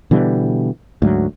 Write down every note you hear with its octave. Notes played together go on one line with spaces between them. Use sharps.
B2 D3 E3 G3
D2 G#2 F#3